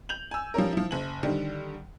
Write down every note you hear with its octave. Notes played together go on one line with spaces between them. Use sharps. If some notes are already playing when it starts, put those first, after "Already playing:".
G6 F7 F#7
G#5 E6
F3 G3 C#4 A#4
F3 E4
F#1 F#7
D3 D#3 G3